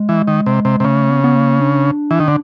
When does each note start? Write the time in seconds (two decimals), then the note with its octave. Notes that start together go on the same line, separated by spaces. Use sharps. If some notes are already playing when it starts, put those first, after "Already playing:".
Already playing: G#3
0.09 E3
0.27 D#3
0.46 C3
0.65 C3
0.80 C3
0.84 C#3 A3
1.10 B3
1.24 B3
1.35 A#3
1.60 D4
2.11 E3
2.20 D#3
2.28 D3